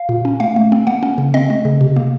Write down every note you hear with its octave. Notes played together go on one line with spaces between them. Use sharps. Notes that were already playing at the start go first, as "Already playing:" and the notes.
Already playing: F5
A#2
C#4
A3 F5
A3
C4
A#3 F#5
C#4
C#3
C4 D#5
A3
C#3
C3
A#3